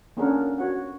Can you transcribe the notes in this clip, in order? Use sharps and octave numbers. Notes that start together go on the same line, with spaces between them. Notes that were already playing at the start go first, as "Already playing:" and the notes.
A#3 C#4 D4 G#4 A#4 F#5
F#4 C#5 F#5